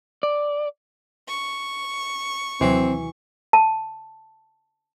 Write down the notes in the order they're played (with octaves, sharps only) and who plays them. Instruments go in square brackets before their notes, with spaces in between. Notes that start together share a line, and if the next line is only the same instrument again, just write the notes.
[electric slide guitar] D5
[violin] C#6
[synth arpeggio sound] D#2 C3 F#3 [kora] E3 [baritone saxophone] C4
[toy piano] A5